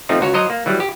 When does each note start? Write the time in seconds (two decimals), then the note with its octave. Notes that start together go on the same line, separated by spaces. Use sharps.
0.09 F3 A3 C4 D#4
0.21 C#2 F#4 C#5
0.34 F#3 C5 D#5 A#5
0.50 A#3
0.66 E3 F#3 G3
0.80 G4